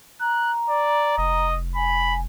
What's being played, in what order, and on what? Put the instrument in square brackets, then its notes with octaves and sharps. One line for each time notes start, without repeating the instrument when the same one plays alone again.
[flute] A#5 [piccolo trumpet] F#6
[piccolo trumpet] D5
[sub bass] F1 [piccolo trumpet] D#5
[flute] G#5 [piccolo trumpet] B5